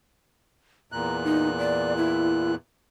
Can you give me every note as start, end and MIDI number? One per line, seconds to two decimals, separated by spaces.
0.92 2.55 40
0.92 2.55 46
0.92 1.17 82
0.92 2.55 90
1.24 1.50 63
1.59 1.96 74
1.97 2.52 64